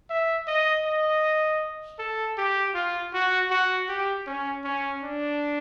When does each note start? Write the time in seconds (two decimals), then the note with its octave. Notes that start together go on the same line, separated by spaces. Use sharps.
0.10 E5
0.47 D#5
0.85 D#5
1.99 A4
2.38 G4
2.75 F4
3.14 F#4
3.51 F#4
3.89 G4
4.27 C#4
4.64 C#4
5.03 D4